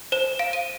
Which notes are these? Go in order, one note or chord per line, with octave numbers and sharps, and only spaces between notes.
C5 E7
F5 D7
D#7